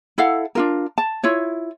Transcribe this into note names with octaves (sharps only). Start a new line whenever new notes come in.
E4 A4 F5 F#5
D4 F4 A#4
A5
E4 F4 C#5